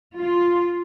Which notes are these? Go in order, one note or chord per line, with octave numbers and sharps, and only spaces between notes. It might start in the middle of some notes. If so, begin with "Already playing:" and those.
F4